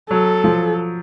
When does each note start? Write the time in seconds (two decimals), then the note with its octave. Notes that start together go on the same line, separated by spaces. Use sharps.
0.10 F#3 A4
0.44 F3